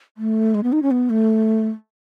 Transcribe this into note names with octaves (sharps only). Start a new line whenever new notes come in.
A3
G#3
B3
D#4
C#4
B3
A3